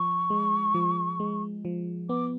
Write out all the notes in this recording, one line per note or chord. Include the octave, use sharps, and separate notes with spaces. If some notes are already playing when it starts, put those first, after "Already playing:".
Already playing: F3 C#6
G#3
F3
G#3
F3
B3 D6